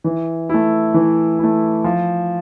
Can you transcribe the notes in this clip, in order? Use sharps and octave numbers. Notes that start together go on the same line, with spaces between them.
E3
A3 E4
E3
A3 E4
F3